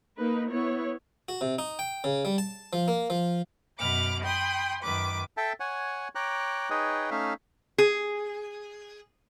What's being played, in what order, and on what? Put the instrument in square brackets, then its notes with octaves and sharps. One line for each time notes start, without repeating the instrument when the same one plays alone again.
[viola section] A#3 D#4 A#4 B4
B3 E4 C#5
[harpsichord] F#4
C3
D#4
G5
C#3
G3
A5
F3
A#3
F3
[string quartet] F#2 B2 B5 D6 F6
G5 B5 C6 D#6
F#2 D#3 B4 D6
[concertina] A4 E5 G5 A5
C#5 F#5 G#5
C#5 G5 A#5 D6 F#6
D#4 G#4 B4 C#5 D#5 G5
A3 C#4 D#4 E5 F5
[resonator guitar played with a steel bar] G#4